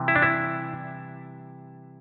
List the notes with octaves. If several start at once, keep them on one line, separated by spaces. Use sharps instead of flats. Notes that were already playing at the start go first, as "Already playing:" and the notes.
Already playing: C3 E3 G3
E4
D4
E4